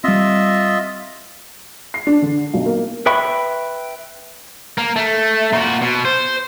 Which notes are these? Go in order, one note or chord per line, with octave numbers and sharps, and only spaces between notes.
G3 C4 F4 D#5 E5
C7
D4
D3
B1
A#3
B4 E5 G5 B5 C#6
A#3
A3
A#2 F#4
B2
C5